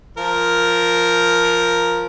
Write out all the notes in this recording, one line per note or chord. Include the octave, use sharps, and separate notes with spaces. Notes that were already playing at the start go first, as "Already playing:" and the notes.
F3 A#4